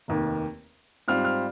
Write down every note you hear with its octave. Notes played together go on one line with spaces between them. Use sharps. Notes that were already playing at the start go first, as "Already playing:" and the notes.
F1 D#2 D#3 A#3
G#2 G3 C4 F4 F6
F6